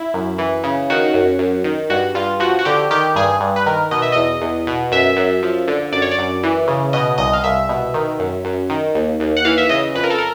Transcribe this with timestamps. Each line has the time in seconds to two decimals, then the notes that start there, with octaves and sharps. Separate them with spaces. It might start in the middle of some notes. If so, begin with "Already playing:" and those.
Already playing: E4
0.14 F#2
0.38 E3
0.64 C#3
0.90 D#3 F#4
1.14 F#2
1.39 F#2
1.64 D#3
1.90 G2 F#4
2.15 G2 F4
2.40 F3 F#4
2.59 F#4
2.65 D3 G4
2.91 D#3 G4
3.15 G2 G#4
3.41 G2
3.56 B4
3.66 D#3 A#4
3.91 B2 D#5
4.02 E5
4.12 E2 D#5
4.41 E2
4.67 B2
4.92 F#2 E5
5.16 F#2
5.43 F3
5.68 D3
5.92 F#2 D5
6.02 C#5
6.11 D5
6.18 F#2
6.43 E3
6.68 C#3
6.93 B2 D#5
7.18 C2 D#5
7.33 F5
7.43 C2 E5
7.69 B2
7.94 D#3
8.19 F#2
8.45 F#2
8.70 D#3
8.95 D#2
9.20 D#2
9.37 F#5
9.45 E3 F5
9.58 E5
9.69 C#3 D#5
9.95 F2 B4
10.04 A#4
10.10 A4
10.18 A#4